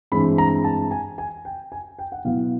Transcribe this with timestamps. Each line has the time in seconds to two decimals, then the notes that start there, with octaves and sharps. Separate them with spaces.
0.12 G2 E3 G#3 C4 B5
0.38 A#5
0.64 A5
0.91 G#5
1.18 G#5
1.45 G5
1.72 G#5
1.99 G5
2.12 F#5
2.25 B2 F#3 B3 E4 F5